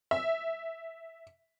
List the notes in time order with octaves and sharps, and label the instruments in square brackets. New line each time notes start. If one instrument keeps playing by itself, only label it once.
[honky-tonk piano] E5